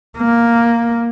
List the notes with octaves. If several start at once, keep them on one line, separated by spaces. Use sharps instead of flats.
A#3